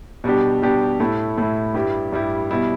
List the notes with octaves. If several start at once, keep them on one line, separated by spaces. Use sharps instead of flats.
B2 G3 D4 G4
B2 G3 D4 G4
A2 A3 E4
A2 A3 E4
G2 G3 E4 G4
G2 G3 E4 G4
B2 G3 E4